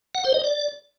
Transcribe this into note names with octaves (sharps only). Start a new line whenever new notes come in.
F#5
C5
D#5
D5